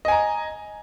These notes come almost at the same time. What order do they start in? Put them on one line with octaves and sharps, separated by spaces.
D#5 G#5 A#5